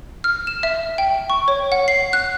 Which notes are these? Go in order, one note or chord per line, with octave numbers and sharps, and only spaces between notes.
F6
E7
E5
G5
C#6
C#5
F#5
C7
F#6